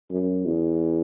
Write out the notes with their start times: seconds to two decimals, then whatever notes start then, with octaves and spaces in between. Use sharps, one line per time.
0.10 F#2
0.45 E2